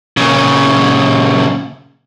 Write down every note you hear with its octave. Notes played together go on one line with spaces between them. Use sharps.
A#2 C#3